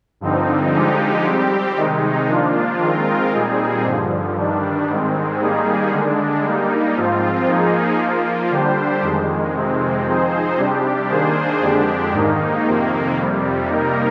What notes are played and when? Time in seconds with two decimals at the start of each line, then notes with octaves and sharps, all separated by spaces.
0.21 G2 D3 F3 C4 D#4
0.72 D3 F3 G#3 D#4 G4
1.25 G3 C4 G4
1.76 C3 D#3 G#3 D#4
2.28 F3 A#3 D4 F4
2.80 D#3 G#3 C4 F4 A#4
3.32 A#2 G3 C4 D#4 G#4
3.83 G2 D3 F3
4.35 G2 D#3 G3 D4
4.88 G#2 D#3 G#3 C4
5.39 D#3 G3 A#3 D#4 G#4
5.91 D3 G#3 D4
6.43 G3 A#3 D#4
6.95 G#2 F3 C4 F4
7.46 F3 A#3 D#4 G#4
7.98 F3 A#3 F4
8.51 D3 G3 D4 G4 C5
9.02 F2 D#3 G#3
9.54 F2 C3 D#3 G#3 C4
10.06 F3 C4 D#4 G#4 C5
10.57 C3 G3 D4 G4
11.09 D#3 A#3 D4 G#4 C5
11.61 F2 D3 G#3 D4 G4
12.13 G#2 D#3 A#3 D#4
12.65 F2 C3 D#3 A#3
13.17 F2 C3 G3
13.69 C3 G3 A#3 D#4 A#4